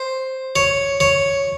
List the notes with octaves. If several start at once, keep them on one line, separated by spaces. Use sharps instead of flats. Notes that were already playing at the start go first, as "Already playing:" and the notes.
Already playing: C5
C#5
C#5